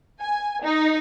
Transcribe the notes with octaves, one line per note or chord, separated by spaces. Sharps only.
G#5
D#4